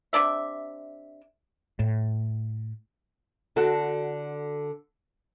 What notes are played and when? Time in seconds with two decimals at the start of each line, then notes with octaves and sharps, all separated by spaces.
0.13 C3 D4 D5 E5
1.79 A2
3.56 D3 F#4 A4